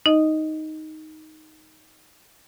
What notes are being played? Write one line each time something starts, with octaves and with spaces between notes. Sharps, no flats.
D#4 D#5